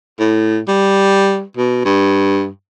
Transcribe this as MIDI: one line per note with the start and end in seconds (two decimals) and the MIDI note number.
0.19 0.58 45
0.68 1.43 55
1.57 1.81 47
1.85 2.48 43